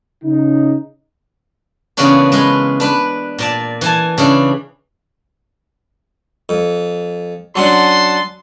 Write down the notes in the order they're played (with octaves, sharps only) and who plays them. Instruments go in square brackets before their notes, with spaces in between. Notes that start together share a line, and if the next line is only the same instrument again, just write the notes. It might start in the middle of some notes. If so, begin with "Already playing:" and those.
[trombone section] C#3 D#4
[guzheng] C#3 E3 A#3 B3 C#4 D4
G#3 C#4 B4
D4 B4
A#2 D5 A5
E3 G#5 A5
C#3 E3 D4
[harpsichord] F2
[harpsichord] F#3 C#4 D4 [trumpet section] F#5 A5 C6